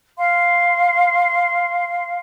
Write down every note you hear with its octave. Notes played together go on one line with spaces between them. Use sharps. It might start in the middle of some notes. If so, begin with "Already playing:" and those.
F5 C6